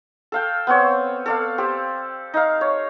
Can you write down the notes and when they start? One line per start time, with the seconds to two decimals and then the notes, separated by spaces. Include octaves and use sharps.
0.32 A4 F5 G5
0.67 B3 C4 C#5
1.26 A4 D5 F5
1.58 C4 G4
2.34 D#4 F5
2.61 C#5